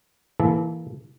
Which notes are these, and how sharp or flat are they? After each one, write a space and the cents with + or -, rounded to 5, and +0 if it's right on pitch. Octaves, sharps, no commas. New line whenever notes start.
E3 +0 A#3 +0 A4 -35